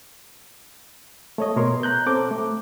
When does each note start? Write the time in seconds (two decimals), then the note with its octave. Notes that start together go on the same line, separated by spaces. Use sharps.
1.38 A3 C#5 D#5
1.56 B2 A#4 C#5 C6
1.83 A#5 F#6 G6
2.06 C4 A4 D6
2.31 A3